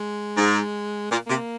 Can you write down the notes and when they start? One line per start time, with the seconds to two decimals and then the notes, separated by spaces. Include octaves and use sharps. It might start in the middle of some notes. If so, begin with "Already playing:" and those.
Already playing: G#3
0.37 G#2
1.11 A#2 A#3
1.27 C3 A#3